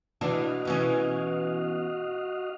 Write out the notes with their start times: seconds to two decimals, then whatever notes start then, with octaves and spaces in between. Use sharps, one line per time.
0.21 E3 D4 F#4 D#5 F5
0.65 B2 E3 C#4